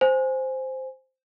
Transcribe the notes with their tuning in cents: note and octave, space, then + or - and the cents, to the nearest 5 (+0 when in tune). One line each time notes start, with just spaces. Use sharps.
C5 +0 G#5 +0